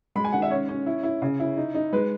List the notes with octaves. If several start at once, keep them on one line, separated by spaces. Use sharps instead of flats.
G#3 B5
G#5
D#3 F#5
E5
C#4 C#5
C#4
E4
E4
C#3
E4
D#4
D#4
G#3 B4